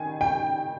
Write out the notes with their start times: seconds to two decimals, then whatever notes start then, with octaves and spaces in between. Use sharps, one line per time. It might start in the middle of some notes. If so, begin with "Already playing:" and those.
Already playing: D#3 G#5
0.21 G5